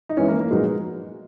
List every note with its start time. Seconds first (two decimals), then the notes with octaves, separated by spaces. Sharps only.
0.09 D#4
0.17 E3 G#3 B3 C#4 E4
0.28 A#3
0.40 A#3
0.51 A#2 F#3 G#3 B3 D#4 F#4